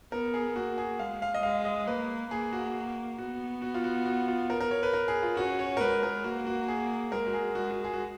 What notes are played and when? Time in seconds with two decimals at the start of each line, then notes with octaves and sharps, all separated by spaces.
0.12 B3 A#4
0.34 G#4
0.56 A#3 F#4
0.78 G#4
0.99 G#3 F5
1.22 F5
1.34 D#5
1.43 G#3 F5
1.65 D#5
1.87 A#3 B4
2.31 A#3 G#4
2.53 F#4
3.18 B3 F#4
3.62 F#4
3.74 F4
3.84 F#4
4.06 F#4
4.28 F4
4.50 A#4
4.60 A#4
4.71 C#5
4.83 B4
4.93 A#4
5.08 G#4
5.23 F4
5.36 C#4 F#4
5.59 C#5
5.77 A#4
5.81 G#3 B4
6.03 A#4
6.24 A#3 F#4
6.47 F#4
6.68 G#4
7.12 G#3 A#4
7.27 F#4
7.33 G#4
7.55 G#3 F#4
7.71 F#4
7.85 G#4
7.93 F#4